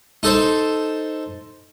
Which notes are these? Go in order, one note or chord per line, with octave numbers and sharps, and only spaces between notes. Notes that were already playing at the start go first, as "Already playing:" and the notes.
D#4 A4 C5